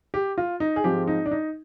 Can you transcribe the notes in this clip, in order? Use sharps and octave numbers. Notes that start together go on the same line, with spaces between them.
G4
F4
D#4
G#4
G#2 F3 G#3 C4 G4
D#4
D4
D#4